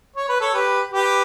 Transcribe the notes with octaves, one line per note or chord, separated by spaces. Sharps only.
C#5
B4
A4 C#5
G4 B4
G4 B4